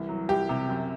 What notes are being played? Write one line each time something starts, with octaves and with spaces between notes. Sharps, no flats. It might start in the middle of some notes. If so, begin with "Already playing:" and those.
Already playing: C2 E3
F#3
C2 G4
C3
F#2